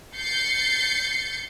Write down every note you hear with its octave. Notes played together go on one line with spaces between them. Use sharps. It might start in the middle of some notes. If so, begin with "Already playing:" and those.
G6 A6 C7 C#7